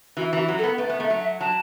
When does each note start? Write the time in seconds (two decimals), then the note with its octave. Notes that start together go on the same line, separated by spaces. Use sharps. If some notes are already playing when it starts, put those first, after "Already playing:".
0.17 E3 F#4
0.33 E3
0.38 F#4
0.48 F#3
0.58 A4
0.63 B3
0.78 A3 B4
0.89 B3
1.00 A3 E5
1.10 F#3
1.20 E5
1.40 F#3 A5